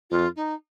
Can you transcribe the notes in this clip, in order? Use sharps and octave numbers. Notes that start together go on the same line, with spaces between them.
F2 F4
D#4